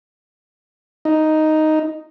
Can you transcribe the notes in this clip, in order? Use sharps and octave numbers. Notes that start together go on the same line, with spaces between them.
D#4